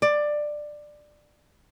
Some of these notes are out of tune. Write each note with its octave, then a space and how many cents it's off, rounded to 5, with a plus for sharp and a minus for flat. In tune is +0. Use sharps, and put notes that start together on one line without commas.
D5 +15